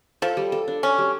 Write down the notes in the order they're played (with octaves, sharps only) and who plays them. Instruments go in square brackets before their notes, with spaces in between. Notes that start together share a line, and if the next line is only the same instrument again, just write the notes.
[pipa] F3 [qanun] A4
[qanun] G3
A4
D4
[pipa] C#4 [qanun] D4
[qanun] G3